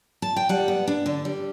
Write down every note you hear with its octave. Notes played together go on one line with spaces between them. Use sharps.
A5
G5
G3 F#5
B3
D4
D3
G3